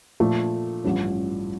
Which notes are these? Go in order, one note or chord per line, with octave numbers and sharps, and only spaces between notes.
A#2 F3 A3
A1 G2 F3 C#4